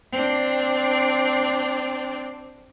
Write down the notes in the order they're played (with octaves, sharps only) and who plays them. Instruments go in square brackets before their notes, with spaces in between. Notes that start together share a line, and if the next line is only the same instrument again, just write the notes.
[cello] C4 D4